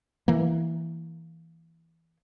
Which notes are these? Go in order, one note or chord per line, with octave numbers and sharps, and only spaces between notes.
E3 A#3